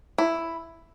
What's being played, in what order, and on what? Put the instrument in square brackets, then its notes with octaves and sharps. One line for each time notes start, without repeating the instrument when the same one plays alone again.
[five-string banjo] E4